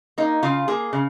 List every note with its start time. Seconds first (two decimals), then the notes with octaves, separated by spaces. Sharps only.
0.18 A#3 D#4
0.43 C#3 F4
0.68 A#3 G#4
0.93 C#3